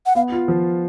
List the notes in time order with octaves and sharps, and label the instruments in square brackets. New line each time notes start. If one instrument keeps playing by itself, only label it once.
[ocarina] F#5
[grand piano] B3 [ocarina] F5
[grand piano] F4
F3